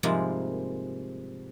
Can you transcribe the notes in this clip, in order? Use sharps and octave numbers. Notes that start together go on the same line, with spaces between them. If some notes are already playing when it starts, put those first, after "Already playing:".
G#2 C3 F3 G3 G#3 A#3